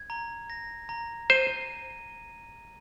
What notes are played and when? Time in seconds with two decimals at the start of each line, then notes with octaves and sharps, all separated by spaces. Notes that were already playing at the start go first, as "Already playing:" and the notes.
Already playing: G#6
0.10 A#5
0.50 A#6
0.89 A#5
1.30 C5 D#7